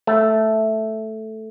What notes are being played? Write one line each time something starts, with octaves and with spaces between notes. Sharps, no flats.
A3